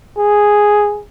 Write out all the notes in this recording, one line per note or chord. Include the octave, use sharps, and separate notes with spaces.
G#4